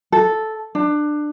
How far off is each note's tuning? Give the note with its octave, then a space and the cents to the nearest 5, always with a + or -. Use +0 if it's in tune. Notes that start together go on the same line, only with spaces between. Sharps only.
A4 -5
D4 +20